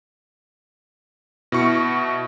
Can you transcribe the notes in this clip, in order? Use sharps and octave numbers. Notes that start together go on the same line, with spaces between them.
B2 E4 C#6 C#7